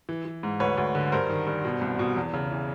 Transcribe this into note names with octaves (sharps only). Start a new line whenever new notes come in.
E3
E3
G#2
D2 B4 C#5
D2
D3
G2 A#4 C5
D#3
G2
B2
C2
B2
E2
C#3
E3